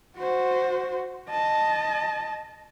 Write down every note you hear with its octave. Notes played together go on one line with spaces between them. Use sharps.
F#4 C5
D#5 A5